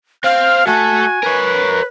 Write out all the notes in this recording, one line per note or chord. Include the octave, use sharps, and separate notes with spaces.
C4 F5 F6
A3 F#4 A4 G#5
A#4 B4 C#5